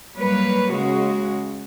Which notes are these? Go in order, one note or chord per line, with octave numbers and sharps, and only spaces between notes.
F#3 G3 A#3 B4 C#5
C#3 G#3 F#4